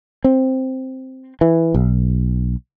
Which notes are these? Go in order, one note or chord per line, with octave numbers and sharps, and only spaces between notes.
C4
E3
B1